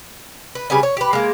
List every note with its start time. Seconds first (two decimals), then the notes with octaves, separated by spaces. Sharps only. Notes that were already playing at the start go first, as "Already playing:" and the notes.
0.55 B4
0.70 C#3 G3 B4 G#5
0.83 C#5
0.97 G4 B4
1.13 G#3 A#3